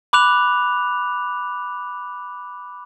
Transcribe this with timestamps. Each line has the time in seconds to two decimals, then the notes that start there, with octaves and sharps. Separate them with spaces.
0.13 B5 D6 F#6 F7